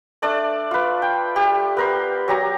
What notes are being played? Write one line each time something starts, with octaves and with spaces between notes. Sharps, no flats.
A3 D4 D5 A5
F4 B4
G5
G4
B3 A#4 C5
F#3 G4 A#5